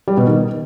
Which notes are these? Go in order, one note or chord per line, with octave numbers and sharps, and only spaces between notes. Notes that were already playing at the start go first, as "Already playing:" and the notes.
G3
B2
D#3